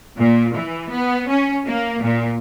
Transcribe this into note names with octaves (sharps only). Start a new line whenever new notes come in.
A#2
E3
B3
C#4
A#3
A#2